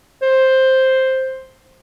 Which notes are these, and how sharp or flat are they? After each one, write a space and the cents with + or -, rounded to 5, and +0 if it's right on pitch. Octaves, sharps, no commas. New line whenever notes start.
C5 +5